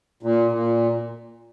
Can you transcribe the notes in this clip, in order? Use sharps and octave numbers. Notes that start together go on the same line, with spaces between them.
A#2
A#2